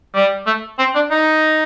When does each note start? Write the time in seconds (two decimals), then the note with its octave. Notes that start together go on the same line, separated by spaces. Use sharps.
0.15 G3
0.47 A3
0.79 C4
0.95 D4
1.11 D#4